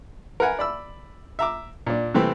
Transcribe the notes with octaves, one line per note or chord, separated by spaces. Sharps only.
A#4 B4 F#5 G#5
D5 B5 E6
E5 A#5 D6
A#2 D4
C3 E3 A3 C4